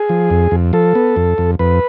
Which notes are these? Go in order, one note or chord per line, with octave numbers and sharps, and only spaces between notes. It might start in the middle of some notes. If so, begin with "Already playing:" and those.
Already playing: G#4
F3
F2
F2
F3 A4
B3
F2
F2
F2 B4